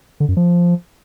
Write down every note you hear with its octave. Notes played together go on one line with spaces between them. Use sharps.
D3
F#2
F3